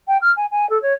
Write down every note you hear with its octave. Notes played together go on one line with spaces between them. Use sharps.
G5
F6
G#5
G#5
A4
C#5